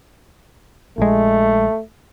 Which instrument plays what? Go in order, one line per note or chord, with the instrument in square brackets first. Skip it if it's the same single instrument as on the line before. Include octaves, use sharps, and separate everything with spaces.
[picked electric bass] A#1 G#3 [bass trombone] A3